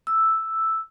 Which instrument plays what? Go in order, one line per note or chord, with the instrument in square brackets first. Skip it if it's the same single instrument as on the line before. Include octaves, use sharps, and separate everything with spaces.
[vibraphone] E6